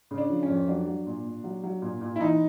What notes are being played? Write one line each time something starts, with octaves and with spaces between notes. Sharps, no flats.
C#3
D4
F3
C#4
F2
F#3 D4
F#3
A#2
A#2
F#3
F#3
A#2
A#2
E4
E3 D#4